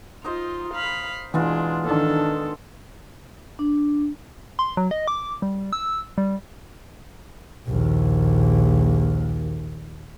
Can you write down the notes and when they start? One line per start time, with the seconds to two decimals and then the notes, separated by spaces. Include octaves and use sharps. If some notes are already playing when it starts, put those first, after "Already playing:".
0.24 D#4 F4 C5 D#5
0.74 F5 B5
1.34 B2 E3 G#3 D4 F4
1.85 D#3 D4 A4
3.59 D4
4.59 C6
4.77 F#3
4.91 D#5
5.07 D6
5.42 G3
5.73 E6
6.18 G3
7.68 A#1 D#2